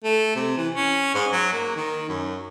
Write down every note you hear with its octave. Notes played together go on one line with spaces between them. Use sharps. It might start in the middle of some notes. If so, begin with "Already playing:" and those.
A3
C3
E3
C#4
G#2
F#3
A#3
D#3
F#2